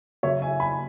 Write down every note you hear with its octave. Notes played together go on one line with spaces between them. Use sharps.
C#3 F#3 C#5 E5
E5 G#5
G#5 B5